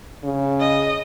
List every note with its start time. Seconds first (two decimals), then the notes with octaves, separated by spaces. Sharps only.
0.24 C#3
0.61 D#5